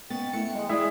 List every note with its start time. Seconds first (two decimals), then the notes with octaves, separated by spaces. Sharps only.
0.10 B3 C#4 D#4 G5 A6
0.33 A3 B3 E4 C#7
0.55 E2 G#3
0.69 G#3 E4 G#4 D5 E5